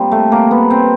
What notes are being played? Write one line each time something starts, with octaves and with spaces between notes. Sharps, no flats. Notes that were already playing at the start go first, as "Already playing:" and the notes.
Already playing: A#2 G3 C4
A3
A#3
B3
C4